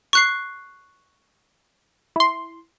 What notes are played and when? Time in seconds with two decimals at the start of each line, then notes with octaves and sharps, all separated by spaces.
0.13 C#6 F#6 C7
2.16 E4 C6